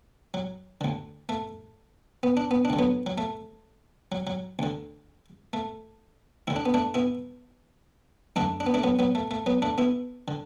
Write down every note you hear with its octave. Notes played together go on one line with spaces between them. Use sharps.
F#3
D2 D3
A3
B3
D4
B3
D4
D2 D3
F#3 B3
F#3
A3
F#3
F#3
D2 D3
A3
D2 D3 E4
D4
B3
A3 D4
B3 E4
F#2 D3 A3 D4
D4
B3
A3 D4
F#3 B3
F#3 B3
A3
A3
F#3 B3
A3 D4
B3 E4
D3